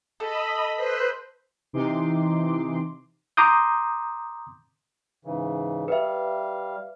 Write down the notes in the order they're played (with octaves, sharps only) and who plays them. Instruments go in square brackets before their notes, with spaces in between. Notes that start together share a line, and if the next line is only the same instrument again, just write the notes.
[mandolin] A4 [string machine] D#5 B5
[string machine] B4 C5
[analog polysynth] C3 E3 D#4 C6 D6
[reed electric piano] A#5 C6 D6 D#6 G6
[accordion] G#2 C#3 E3
[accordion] G3 F5 [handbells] B4 E5